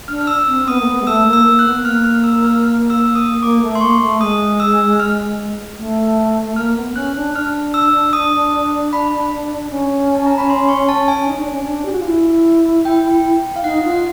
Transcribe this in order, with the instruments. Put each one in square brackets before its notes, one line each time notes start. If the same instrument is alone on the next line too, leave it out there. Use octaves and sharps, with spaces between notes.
[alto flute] D4 [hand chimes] F6
[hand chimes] F6
E6
[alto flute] C4
[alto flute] B3 [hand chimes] D#6
[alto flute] A#3
B3
G#3
[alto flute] A3 [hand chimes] E6
[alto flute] A#3
[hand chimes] E6
[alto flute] A#3
[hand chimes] F#6
[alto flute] B3
[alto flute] A#3 [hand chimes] F6
[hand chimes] F6
E6
F6
F6
E6
D#6
[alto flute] A#3 [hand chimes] D6
[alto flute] A3
[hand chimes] C6
[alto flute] A#3 [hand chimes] C#6
[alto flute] A3
[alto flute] G#3 [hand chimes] D#6
[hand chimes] E6
F6
[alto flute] A3
[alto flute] A#3 [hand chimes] F6
[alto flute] B3
[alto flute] C#4 [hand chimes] F#6
[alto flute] D4
[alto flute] D4 [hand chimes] F6
[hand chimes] E6
D#6
B5
[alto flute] C#4
[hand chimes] A5
A#5
B5
C6
C#6
A5
G#5
[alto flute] D#4
D4
C#4
D4
G4
F#4
F4
E4
[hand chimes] G5
F5
[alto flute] D#4 [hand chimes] F#5
[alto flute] F4
[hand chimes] F#5